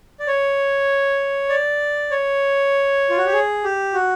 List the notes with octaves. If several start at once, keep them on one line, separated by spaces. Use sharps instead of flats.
D5
C#5
D5
C#5
F4
F#4
G4
G#4
G4
F#4